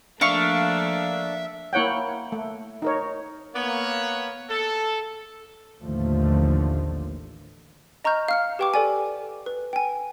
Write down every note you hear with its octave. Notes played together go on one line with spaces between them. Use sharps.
F3 A3 A#3 D4 E5 F5 C#6
A#3 E4 C#5 F#5 G5
A3
D#4 A#4 C#5
A#3 B3 C#5
A4
A1 D#2 D3 F3 A3
D#5 A#5 C#6 F6 G6
F5 F6 C#7
G4 B4 G5 C#6 D6
A4 D5 G#5
B4
G5 G#5